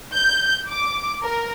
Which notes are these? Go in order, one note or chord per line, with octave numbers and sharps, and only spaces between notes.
G6
D6
A#4